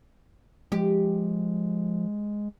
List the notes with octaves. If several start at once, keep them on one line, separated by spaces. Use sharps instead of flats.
F3 G#3 G4